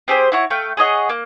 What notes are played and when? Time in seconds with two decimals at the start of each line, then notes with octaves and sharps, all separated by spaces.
0.08 C4 G4 G#4 C5
0.32 E4 F#4 C#5
0.50 A3 F5 G5
0.77 G#4 C#5 D#5 F#5
1.09 A#3